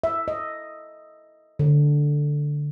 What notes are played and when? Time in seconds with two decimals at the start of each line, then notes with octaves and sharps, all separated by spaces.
0.04 E5
0.28 D#5
1.59 D3